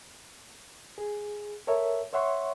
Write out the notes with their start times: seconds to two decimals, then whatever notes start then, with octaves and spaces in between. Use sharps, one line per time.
0.98 G#4
1.67 A4 A#4 C#5 E5
2.13 C5 C#5 E5 F#5 C6 C#6